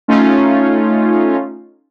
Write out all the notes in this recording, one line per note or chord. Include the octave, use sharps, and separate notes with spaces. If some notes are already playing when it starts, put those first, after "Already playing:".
A3 C#4 D#4 F4